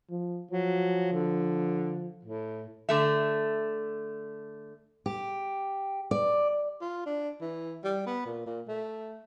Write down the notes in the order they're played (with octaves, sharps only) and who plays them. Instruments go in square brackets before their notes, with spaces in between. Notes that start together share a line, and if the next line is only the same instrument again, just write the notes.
[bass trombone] F3
[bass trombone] F3 [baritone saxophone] F#3
[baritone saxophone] D3
A2
[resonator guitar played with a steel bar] D3 A3 E5
[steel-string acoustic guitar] G4
D5
[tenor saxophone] F4
D4
E3
G3
B3
A#2
A#2
A3